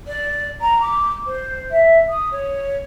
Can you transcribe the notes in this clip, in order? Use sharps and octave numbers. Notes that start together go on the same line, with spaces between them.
D5
A#5
D6
C5
E5
D#6
C#5